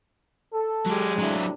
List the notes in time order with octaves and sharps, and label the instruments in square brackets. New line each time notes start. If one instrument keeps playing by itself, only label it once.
[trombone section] A4
[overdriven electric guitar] F#3 G4 [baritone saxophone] G#3
[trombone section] A2 C3 D4 [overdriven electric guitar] F#3 E4